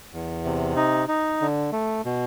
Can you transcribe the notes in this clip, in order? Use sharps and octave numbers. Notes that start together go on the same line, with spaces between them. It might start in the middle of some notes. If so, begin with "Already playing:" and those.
E2
C3
D#4
D#4
D3
A3
B2